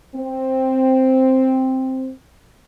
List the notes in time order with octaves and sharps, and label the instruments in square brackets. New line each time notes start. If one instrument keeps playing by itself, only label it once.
[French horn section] C4